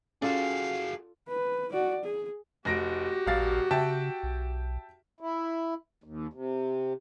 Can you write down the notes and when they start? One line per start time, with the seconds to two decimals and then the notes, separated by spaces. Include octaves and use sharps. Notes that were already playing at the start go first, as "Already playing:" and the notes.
0.22 C#4 F4 F#4 G#4 A4 D5 F5
1.29 B4
1.73 F#4 D5
2.05 G#4
2.65 F1 F#4 G4 A#6 D7
3.27 D#1 A1 F5 A6
3.71 C#3 E5 G5 A5
4.23 B1
5.20 E4
6.04 D#2
6.33 C3